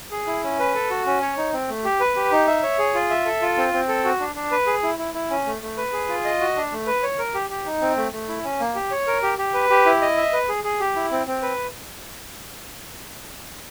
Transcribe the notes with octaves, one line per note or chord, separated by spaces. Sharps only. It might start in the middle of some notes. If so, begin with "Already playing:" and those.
G#4
E4
C#4
B4
A4
F#4
C#4
C#5
D#4
C4
A3
G4
B4
G4
D#4
E5
C#5
G#4
F4
E5
A4
F4
C4
C4
A4
F#4
D4
D4
B4
G#4
E4
E4
E4
C#4
A3
A3
B4
G#4
F4
D#5
F#4
D4
A3
B4
C#5
A#4
G4
G4
D#4
C4
A3
A3
E4
C#4
A#3
G4
C#5
A#4
G4
G4
B4
G4
E4
D#5
E5
B4
G#4
G#4
G4
E4
C4
C4
B4